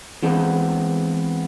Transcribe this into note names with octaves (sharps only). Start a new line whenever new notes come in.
E3 G#3 B3 C4